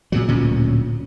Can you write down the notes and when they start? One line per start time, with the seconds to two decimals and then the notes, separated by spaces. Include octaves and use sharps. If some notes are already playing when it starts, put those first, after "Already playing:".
0.12 A#2 C#3 F#3
0.28 D1 D2 A#2 C#4